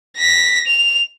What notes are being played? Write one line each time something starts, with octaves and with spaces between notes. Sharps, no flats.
A#6 B6
F7